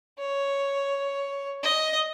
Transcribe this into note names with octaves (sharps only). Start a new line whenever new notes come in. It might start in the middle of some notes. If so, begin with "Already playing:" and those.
C#5
D#5